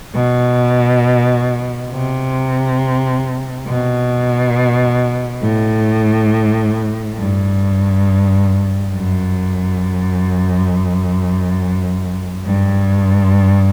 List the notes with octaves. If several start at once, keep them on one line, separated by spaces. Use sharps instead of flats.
B2
C3
B2
A2
G2
F#2
G2